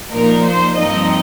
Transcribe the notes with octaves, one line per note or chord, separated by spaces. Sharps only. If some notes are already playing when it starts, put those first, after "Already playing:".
A#2 F3 D#4 A#4
C5
G2 F3 C4 D#4 D#5